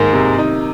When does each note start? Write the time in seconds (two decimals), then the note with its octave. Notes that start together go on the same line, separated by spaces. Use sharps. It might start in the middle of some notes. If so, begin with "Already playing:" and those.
Already playing: G#2 D#3 G#3 A#3
0.13 C3
0.38 D#4